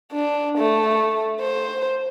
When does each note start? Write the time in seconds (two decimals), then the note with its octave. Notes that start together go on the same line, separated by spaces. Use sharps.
0.12 D4
0.58 A3
1.40 C5